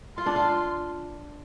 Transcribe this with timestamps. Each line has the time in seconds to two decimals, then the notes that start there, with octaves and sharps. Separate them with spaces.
0.17 F4 C6
0.26 D4
0.36 F4